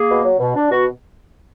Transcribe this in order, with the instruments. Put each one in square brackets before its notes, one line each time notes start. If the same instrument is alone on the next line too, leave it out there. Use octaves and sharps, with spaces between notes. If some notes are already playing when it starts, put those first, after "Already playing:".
Already playing: [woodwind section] A#3 G#4
B2
F#3
B2
D4
B2 F#4